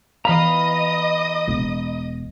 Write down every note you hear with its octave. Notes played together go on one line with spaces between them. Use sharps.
E3 D#5 F5 A#5 B5 D#6
E1